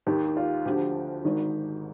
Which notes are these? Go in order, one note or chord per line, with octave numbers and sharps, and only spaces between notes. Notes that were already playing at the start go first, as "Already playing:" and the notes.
D#2 D#3 G4
G4
F4
D2 D3 F3 G4
G#1 G#2 D#3